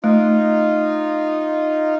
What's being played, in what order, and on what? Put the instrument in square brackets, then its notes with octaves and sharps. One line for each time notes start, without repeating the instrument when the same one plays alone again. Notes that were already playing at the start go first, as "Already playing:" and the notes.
[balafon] A3 [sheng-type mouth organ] D#4 F4